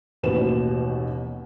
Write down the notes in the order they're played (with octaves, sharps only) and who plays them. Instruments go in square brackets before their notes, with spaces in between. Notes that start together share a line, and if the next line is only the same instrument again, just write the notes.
[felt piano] A1 D#2 B2 B4 E7